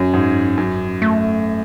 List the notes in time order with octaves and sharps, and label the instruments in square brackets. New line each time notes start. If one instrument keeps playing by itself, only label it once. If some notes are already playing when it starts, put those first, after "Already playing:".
Already playing: [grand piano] F#2 [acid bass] C#4
[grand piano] G#2
F#2
[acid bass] A3